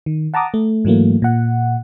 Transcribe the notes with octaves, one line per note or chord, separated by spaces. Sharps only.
D#3
F#5 A5 A#5 D6 D#6
A3
G#2 E3 F#3 A3 A#3
A#2 F#5